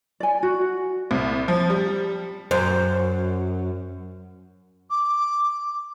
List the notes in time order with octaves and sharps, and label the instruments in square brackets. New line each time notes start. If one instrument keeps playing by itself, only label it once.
[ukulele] D5 G#5
F#4
[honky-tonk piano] C2
F3
G3
[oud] F#2 [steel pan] C5
[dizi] D6